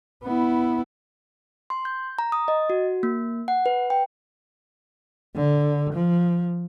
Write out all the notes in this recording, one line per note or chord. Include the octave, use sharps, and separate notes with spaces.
B3 E4
C6
G6
A#5
D#6
D#5
F#4
A#3
F#5
B4
G5
D3
F3